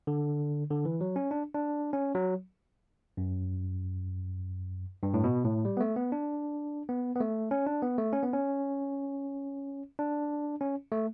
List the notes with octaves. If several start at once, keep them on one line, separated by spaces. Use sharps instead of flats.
D3
D3
E3
F#3
C#4
D4
D4
C#4
F#3
F#2
G2
A2
B2
A2
G3
B3
A3
B3
D4
B3
B3
A3
C#4
D4
B3
A3
C#4
B3
C#4
D4
C#4
A3